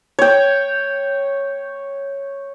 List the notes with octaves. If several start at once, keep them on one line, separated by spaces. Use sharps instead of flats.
C#5 G5